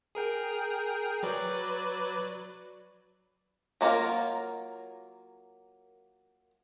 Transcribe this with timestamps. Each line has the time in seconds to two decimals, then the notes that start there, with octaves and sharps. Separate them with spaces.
0.15 G#4 A#4 G5
1.23 F#3 B4 D5
3.81 F#3 A#3 F4 A#4